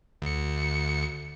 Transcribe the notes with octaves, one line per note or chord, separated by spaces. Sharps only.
D2 C#7